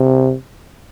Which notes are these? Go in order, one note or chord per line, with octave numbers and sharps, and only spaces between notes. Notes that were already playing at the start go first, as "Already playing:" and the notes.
Already playing: C3